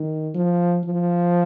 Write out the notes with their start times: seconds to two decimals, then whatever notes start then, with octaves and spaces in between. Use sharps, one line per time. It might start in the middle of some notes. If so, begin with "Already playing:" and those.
Already playing: D#3
0.34 F3
0.84 F3